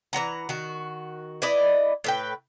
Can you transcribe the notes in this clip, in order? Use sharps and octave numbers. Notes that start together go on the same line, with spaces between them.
E3 C4 F#5 A#5
D#3 F#4
E4 B4 D5 D#5
A2 B4 G5